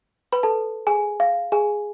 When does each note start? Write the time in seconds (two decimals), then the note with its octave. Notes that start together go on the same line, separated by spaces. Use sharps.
0.32 B4 B5
0.43 A4 A5
0.87 G#4 G#5
1.20 F5
1.52 G#4 G#5